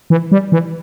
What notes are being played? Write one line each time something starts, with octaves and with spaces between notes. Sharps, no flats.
E3
G3
E3